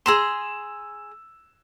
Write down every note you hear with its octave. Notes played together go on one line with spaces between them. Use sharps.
G#4 A#5 C6 E6 E7